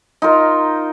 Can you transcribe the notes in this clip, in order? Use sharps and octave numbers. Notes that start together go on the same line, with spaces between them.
D#4 F4 A#4